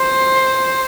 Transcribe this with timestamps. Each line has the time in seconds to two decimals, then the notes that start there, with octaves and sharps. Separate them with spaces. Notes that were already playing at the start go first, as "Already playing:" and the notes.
Already playing: C5